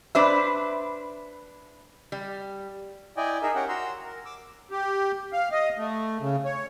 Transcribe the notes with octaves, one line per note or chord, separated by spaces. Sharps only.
D4 B4 C5 E5 B5
G3
E4 D5 D#5 G5 G#5
D#4 G#4 A#4 E5
C#4 G4 A#4 F#5 G5
F#4 A#5 C6 E6
A#4
D6 E6
G4
F5
D#5
A3
C#3
C#5